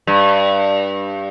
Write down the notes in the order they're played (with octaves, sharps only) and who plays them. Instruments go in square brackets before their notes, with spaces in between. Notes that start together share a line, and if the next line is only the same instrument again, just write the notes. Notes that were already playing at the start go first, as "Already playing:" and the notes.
[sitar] G2